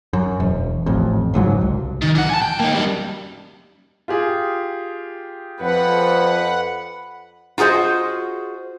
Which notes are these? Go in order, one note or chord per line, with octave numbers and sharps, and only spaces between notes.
F#2
E1
A1 F2
F#1 C#2 G#2 F#3
C2
D#3
E3 F#5
G#5 A5
G5
A#3 D#4
F#2 G3
F4 G4 G#4
F2 B4 F#5
F4 F#4 G#4 C5 D#5